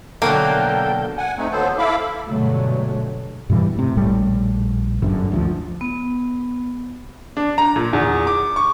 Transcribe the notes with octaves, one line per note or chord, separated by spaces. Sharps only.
B2 D3 F#3 A#3 A4 G5
F#5 G#5
A3 C4 D#4
D#2 F#3 B3 A4 C5
E4 A4 E5 F5 B5 D6
G2 B2 D3 F#3 G#3 A3
G2 B2 E3 G3
A2 C3
A#1 A2 G3 A3
G1 F#2 D3
D2 E3 F3
B3
D4
A#5
A#2
E2
D6
C#6